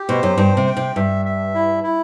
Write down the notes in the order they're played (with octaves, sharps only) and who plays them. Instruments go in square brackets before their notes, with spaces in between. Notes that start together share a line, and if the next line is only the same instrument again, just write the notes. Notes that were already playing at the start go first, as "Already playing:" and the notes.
Already playing: [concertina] G4
[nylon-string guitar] B2 [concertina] C5
[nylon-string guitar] F#2
[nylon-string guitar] G2 [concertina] G5
[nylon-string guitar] C3
[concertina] G5
[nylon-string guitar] C3
[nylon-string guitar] G2 [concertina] E5
[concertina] E5
E4
E4